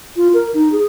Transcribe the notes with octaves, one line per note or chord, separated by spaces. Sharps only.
F4
A#4
D#4
G#4